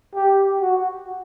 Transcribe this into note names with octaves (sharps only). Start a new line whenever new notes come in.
G4
F#4